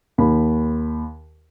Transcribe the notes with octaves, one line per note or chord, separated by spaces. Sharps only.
D#2 B5